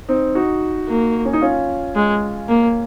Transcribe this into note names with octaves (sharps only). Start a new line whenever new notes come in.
C4 D#4
D#4 F#4
A#3
C#4
D#4
C#4 F4
G#3
A#3